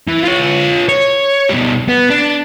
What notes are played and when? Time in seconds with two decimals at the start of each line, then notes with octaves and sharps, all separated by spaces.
0.08 E3
0.23 F4 C#5
0.89 C#5
1.49 B2 G3
1.89 B3
2.10 D4